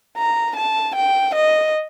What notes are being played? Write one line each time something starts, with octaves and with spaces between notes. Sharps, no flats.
A#5
A5
G5
D#5